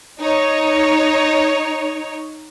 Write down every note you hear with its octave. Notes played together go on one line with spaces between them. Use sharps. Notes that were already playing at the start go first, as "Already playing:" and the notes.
D#4 C#5